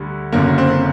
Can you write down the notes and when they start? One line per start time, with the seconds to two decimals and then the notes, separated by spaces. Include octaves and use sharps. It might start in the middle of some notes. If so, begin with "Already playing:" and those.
Already playing: D2 D3 G3
0.33 F#1 F#2 D3 A#3
0.58 C4